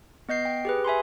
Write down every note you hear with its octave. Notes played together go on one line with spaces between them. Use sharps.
B3 D#5 G6 C7
G5
G4 G#4 B4
E5 G#5 B5 C6